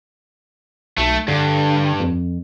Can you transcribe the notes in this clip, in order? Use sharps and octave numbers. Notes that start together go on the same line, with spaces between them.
B1 A3
G2 D3
F2